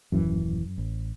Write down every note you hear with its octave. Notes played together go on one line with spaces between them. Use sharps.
D#1 F#2 E3
A1